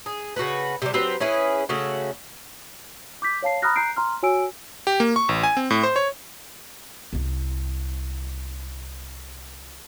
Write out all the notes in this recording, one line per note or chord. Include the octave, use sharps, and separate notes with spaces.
G#4
C#3 F#4 A4 B4
C3 G3
F#3 C4 G4 B4
C#4 E4 G#4 B4
C#3 A3 C#4 F#4
D6 G6 B6
C#5 F5 A5 C7
A#5 B5 D#6 F6 F#6 A#6
A#5 F#6 G6 C7 D7
A#5 C6 F6
F#4 C#5 G#5 E6 D7
G4
A#3
C#6
A1
G#5
C4
A2
C5
C#5
C2 E4